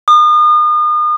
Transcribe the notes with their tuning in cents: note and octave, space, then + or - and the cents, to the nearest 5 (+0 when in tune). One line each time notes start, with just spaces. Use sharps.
D#6 -35